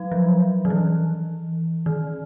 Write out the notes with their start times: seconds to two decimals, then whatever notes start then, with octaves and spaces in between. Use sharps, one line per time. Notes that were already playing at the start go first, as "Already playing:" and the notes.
Already playing: F#3
0.12 F3
0.65 D#3
0.70 E3
1.86 D#3